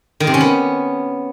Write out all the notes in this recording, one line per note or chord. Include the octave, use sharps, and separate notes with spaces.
D#3
C3
C#4
B3